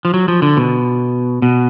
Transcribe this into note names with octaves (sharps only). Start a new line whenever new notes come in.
F3
F#3
F3
D3
B2
B2